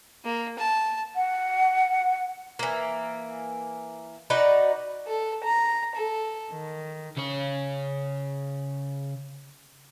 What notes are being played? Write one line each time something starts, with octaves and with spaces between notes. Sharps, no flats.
A#3
A5
F#5
E3 A#3
D#4 F#4 B4 D5
A4
A#5
A4
D#3
C#3 C#5